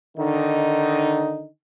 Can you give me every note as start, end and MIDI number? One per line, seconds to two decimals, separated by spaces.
0.18 1.47 50
0.18 1.47 51
0.18 1.47 63